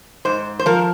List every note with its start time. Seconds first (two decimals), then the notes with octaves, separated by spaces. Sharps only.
0.25 G#2 C5
0.59 C5
0.66 F3 A#4